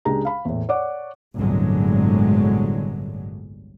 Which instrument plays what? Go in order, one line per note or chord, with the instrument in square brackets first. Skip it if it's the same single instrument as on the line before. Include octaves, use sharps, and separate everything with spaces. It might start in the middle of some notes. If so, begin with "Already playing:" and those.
[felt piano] C#2 G#3 D4 G4 A#5
F5 B5
E2 A2
C#5 D5 F#5 D6
[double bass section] G1 C2 A2 D3 F#3 G#3